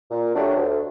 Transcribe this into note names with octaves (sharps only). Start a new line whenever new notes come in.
A#2
F#3 A3 D4 G4
D2